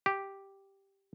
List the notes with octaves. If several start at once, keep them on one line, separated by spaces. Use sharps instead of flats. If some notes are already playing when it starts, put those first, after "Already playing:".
G4